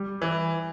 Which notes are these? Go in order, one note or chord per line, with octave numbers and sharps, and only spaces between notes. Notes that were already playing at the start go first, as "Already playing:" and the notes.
Already playing: G3
E3